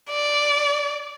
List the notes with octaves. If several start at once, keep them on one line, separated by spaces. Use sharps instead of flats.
D5